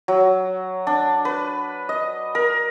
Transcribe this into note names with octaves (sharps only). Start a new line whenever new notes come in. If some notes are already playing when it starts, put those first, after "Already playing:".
F#3
D4
B4
D#5
A#4